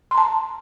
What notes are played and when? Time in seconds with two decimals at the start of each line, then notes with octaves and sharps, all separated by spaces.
0.11 C6
0.14 A#5
0.18 A5